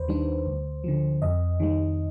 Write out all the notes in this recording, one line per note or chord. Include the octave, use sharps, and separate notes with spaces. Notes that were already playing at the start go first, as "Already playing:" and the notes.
Already playing: D#2 B4 C5
D#3 G3 D4
D2
D3 F3
F2 D#5
D#3 G3